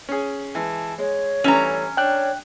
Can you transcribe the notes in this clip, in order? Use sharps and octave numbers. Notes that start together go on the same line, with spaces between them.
C#4 G#4
E3 G#3 A5
G#3 C#5
E3 G3 A3 C#4 A#5
D4 C#5 G5 F#6